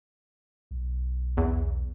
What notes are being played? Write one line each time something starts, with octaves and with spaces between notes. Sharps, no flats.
B1
E2